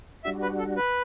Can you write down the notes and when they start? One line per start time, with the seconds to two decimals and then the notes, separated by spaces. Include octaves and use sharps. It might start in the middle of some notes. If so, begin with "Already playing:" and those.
0.24 G3 D4 F#4 E5
0.42 B4
0.59 A4
0.77 B4